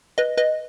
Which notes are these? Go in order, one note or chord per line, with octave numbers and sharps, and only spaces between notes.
B4 D#5
B4 D#5